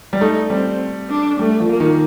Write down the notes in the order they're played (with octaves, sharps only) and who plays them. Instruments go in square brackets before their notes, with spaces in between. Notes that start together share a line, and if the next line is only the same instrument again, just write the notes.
[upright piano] G3
[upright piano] A3 [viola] D#4
[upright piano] G3 [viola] C4
[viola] D4
[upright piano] G3 [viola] A3
[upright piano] F3
[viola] A#3
[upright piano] D#3